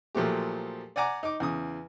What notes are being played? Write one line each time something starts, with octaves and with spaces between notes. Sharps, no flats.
A#2 F3 F#3 A3 G4
D5 F#5 G#5 A#5 D6
D#4 D6
E2 C#3 D#6